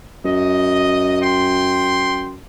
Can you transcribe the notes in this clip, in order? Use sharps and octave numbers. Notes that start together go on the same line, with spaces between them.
F#2 D#5
G5 C6